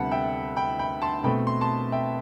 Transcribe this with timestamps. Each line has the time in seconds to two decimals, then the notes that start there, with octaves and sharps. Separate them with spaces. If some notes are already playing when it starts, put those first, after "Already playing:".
Already playing: D2 C3 G3 B3 F#5 A5 B5
0.11 E5 G5
0.56 G5 B5
0.79 G5 B5
1.02 A5 C6
1.24 B2 A3 C4 G5 B5
1.47 C6
1.61 A5 C6
1.92 E5 G5